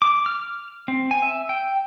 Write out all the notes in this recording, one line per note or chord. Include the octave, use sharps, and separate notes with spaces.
D6
F6
C4
G#5
E5
G5